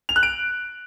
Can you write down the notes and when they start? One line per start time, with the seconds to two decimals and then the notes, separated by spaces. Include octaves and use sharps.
0.09 F7
0.16 F#6
0.23 D7